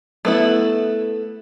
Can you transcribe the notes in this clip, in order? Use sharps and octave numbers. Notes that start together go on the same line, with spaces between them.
A3 B3 E4